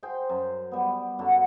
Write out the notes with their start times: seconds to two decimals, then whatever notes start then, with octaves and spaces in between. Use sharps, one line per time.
0.03 G#4 C5 G5 C6
0.30 F#2
0.72 G3 B3
1.19 F#2 D3 F#4